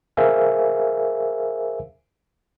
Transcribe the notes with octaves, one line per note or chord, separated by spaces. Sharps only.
G#4 A#4 C5 E5 F5 G#5